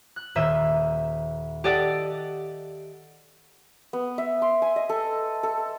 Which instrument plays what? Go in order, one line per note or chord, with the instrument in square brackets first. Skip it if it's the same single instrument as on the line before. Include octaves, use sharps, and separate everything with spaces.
[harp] F#6
D#1 A#3 E5 G6 D#7
G4 A4 D5 D#5 F#5
[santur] B3
E5
C6
G#5
D#5
A4
A4